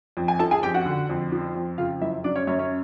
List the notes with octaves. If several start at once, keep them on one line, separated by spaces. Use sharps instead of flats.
F2
G#5
F3 A4 A5
G#4 G#5
F2 G4 G5
F#4 F#5
D3
F2
F3
F2
C#3 F4 F5
F#2 E4 E5
F#3 D4 D5
C#4 C#5
F#2 C#4 C#5
C#4 C#5